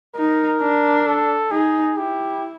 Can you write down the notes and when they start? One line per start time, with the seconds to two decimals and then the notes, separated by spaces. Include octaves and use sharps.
0.15 D#4 A#4
0.61 D4
1.06 A4
1.51 D#4 G#4
1.97 E4 G4